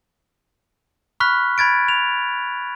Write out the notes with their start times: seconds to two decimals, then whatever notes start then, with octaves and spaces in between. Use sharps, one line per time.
1.20 B5 C#6 F6 F#6 B6
1.58 B5 G#6 A6 D7
1.88 F7